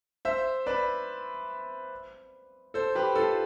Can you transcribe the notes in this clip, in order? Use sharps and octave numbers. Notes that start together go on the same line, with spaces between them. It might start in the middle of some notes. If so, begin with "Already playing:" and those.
C5 E5
B4 D5
A4 C5
G4 B4
F4 A4